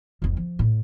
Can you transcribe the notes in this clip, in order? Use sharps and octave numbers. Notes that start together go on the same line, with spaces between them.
F1 C2
F3
A2